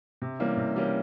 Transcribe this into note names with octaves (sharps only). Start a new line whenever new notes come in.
C3
E3 G3 A#3 C#4
C3
E3 G3 A#3 C#4